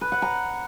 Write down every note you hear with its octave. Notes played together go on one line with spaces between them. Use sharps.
B4
F#5
A#5